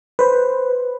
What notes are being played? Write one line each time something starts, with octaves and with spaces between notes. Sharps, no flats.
B4 C5